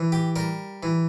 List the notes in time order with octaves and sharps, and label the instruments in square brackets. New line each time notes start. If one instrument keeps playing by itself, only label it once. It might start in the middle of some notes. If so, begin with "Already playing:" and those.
Already playing: [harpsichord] E3
G4
G3 A#4
E3